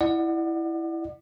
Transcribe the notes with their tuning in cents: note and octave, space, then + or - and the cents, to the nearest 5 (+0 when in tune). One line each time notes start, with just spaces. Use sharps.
E4 +0 D5 +35 F#5 +0